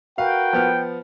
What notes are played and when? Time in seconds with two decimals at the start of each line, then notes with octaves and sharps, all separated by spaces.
0.18 F#4 A#4 B4 F5 G5
0.53 F3 B3 F6